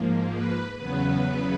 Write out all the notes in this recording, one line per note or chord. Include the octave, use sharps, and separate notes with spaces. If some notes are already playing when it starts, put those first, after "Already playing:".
Already playing: G#2 F3 A#3
B4
E2 C#3 F#3 B3 B4